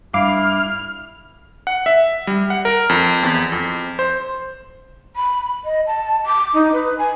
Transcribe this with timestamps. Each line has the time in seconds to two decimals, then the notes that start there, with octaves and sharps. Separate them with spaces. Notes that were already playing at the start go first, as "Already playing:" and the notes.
0.14 G2 E4 F5 D6 F6 C7
1.67 F#5
1.86 E5
2.27 G3
2.50 F#5
2.65 A#4
2.89 F2
3.23 E2
3.52 F2
3.99 C5
5.16 B5
5.65 D#5
5.87 A5
6.26 D6
6.54 D#4
6.73 B4
6.98 G#5